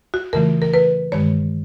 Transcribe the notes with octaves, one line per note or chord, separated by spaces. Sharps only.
F#4
F2 C#3 E3 A3 A#4
A#4
B4
G2 D#3 G#3 C#5